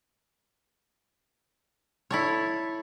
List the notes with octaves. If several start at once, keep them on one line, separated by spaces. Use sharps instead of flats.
E4 A4 C#5